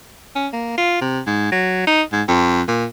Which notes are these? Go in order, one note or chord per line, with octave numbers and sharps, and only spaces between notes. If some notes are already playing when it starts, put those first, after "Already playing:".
C#4
A#3
F4
C3
G#2
F#3
D#4
G#2
F2
A#2